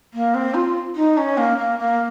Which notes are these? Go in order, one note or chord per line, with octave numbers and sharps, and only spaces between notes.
A#3
C4
F4
D#4
C#4
A#3
A#3
A#3